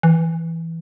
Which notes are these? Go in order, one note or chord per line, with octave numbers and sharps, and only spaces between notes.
E3